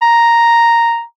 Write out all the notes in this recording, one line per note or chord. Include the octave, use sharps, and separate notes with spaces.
A#5